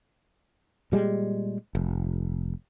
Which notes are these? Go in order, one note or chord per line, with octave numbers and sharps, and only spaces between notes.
A#2 G3 G#3
F1